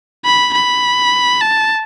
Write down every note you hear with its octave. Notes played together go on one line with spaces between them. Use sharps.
B5
B5
A5